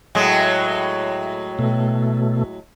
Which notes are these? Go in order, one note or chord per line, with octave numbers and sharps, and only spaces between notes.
A2 F#3 G#3
B2 A3